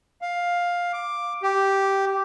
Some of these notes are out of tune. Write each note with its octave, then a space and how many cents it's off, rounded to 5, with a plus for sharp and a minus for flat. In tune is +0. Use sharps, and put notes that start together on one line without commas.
F5 +10
D6 +5
G4 -5